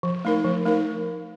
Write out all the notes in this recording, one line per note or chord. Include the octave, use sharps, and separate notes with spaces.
F3
A3 D#4 A#4
F3
A3 D#4 A#4